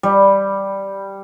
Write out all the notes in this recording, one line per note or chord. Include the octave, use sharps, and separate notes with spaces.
G3